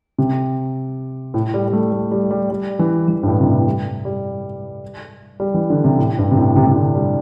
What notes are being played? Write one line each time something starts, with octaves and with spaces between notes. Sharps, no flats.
C3
A2
G3
G3
A3
A3
G3
G3
G3
E3
E3
G2
A2
C3
A2
G3
G3
G3
E3
D3
C3
A2
G2
C3
A2
C3
C3
D3
G3